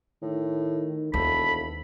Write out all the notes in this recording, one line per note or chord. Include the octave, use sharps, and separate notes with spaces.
A2 D#3
E1 D#2 A4 B5